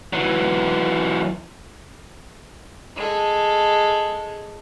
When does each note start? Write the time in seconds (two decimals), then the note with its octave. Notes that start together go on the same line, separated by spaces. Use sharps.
0.13 E3 F#3
2.96 G#3 A4